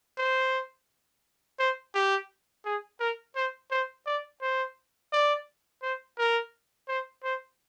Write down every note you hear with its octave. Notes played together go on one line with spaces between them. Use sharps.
C5
C5
G4
G#4
A#4
C5
C5
D5
C5
D5
C5
A#4
C5
C5